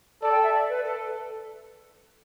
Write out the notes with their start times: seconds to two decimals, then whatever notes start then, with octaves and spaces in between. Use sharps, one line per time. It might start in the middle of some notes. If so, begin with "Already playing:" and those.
0.22 A4 D5
0.32 G5
0.43 E5
0.53 D5
0.69 B4
0.85 A4